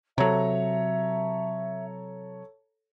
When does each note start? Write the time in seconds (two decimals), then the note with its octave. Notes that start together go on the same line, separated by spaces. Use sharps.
0.18 C3 F#3 A4 C#5 E5 A#5